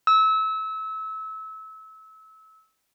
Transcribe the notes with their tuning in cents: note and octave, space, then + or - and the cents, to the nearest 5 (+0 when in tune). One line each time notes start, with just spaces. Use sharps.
E6 -25